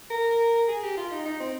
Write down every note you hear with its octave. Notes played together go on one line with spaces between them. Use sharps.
A#4
G#4
G4
F4
D#4
D#4
C4